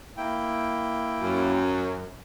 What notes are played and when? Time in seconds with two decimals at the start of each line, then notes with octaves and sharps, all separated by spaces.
0.17 A#3 E4 G5
1.21 F#2